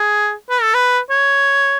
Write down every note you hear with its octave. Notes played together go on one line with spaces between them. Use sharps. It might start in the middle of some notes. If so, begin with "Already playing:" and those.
Already playing: G#4
B4
A4
B4
C#5